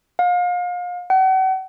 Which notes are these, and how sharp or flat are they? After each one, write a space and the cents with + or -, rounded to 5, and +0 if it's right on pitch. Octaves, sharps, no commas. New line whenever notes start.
F5 +35
F#5 +40